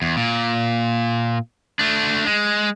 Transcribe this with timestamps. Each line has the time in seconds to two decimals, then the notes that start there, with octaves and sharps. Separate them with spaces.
0.02 E2
0.17 A#2
1.79 A3 D4
2.26 G#3